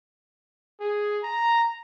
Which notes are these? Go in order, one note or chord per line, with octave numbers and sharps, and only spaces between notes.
G#4
A#5